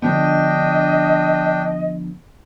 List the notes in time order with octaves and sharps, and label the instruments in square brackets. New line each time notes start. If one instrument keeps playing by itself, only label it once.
[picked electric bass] D3 F3 B3 [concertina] D4 G5 [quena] D#5